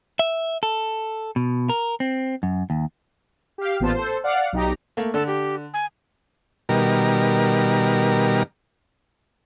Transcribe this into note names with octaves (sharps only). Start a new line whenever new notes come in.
E5
A4
B2
A#4
C4
F#2
D#2
G4 F5
A1 A#2 B3 F4 C5 A5
A4 C5
D5 F5 F#5
B1 D#4 G4 A#5
A3 A#3
D3 A4
G4
G#5
B2 D#3 G3 A#4